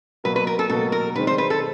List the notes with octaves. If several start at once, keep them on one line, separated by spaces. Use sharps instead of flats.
B2 F#3 A#3 B4
B4
A#4
A4
B2 F#3 A#3 A4
A#4
D#3 G#3 C4 D#4 B4
C5
B4
A4